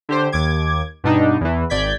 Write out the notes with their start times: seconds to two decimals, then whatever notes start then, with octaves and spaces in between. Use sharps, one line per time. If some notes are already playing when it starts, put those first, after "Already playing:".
0.09 D3 G4 C5
0.32 D#2 D6 G#6
1.04 G2 B2 D4 D#4
1.41 E2 E3
1.70 G#1 D5 G6 G#6 B6